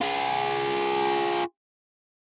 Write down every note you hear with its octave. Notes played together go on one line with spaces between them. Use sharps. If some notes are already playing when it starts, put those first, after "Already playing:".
F4 G#4